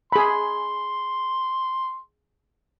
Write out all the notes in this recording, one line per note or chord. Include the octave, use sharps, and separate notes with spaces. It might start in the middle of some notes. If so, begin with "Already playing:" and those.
G#4 B5 C6